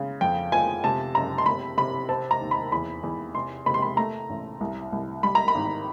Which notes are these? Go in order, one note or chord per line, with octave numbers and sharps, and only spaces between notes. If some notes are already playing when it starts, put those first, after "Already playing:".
Already playing: C#3
F2 G5
F3 G#5
C3 A5
F#1 A#5
C6
C3 B5
C3 B5
C4 A5
A#5
D#2
B5
E2 B5
E2
C3 C6
C3 B5
C6
B5
A3 A#5
A1
C2
C2
G3 B5
A#5
B5
G#1